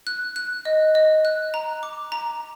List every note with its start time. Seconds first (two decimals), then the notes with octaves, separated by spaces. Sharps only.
0.07 F#6
0.36 F#6
0.65 D#5
0.95 D#5
1.25 F#6
1.54 A#5
1.83 D6
2.12 A#5